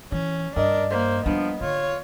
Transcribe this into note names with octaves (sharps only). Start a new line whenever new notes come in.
E3 C#4
G2 D4 A#4 D#5
A#3 C5
F3 G3 B3 D4
D3 F4 C#5